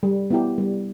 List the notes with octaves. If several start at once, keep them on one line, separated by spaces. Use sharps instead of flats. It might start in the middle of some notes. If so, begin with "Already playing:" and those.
G3
B3 E4 G4
G3